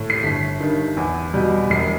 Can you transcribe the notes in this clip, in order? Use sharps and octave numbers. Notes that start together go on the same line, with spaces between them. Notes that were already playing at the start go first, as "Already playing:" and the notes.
Already playing: A2
C7
G1 B6
G2 D#3
E2
B2 G3
E1 C7